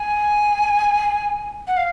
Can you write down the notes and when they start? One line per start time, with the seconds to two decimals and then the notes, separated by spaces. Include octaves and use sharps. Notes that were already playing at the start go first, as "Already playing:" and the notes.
Already playing: G#5
1.67 F#5
1.77 F5